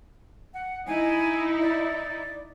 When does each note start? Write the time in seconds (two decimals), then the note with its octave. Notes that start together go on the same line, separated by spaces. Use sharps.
0.54 F#5
0.87 D#4 E4 G#5
1.61 D5